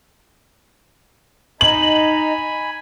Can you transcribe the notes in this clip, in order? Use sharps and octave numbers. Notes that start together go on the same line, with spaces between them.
D#4 G#5 B5 F#7